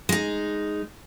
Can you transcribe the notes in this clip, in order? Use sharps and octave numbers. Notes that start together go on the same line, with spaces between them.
G#3 D#4